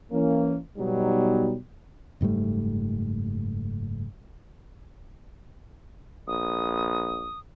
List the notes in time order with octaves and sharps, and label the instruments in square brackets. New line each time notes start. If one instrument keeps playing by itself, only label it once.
[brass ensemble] E3 A#3 C#4
B2 F#3 G3 D#4
[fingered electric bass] F#1 G#2 G3 A3
[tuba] A#1 [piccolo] D#6